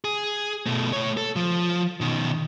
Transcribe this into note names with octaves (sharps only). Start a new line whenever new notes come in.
G#4
B2 A3
A3 C#5
A4
F3
B2 D#3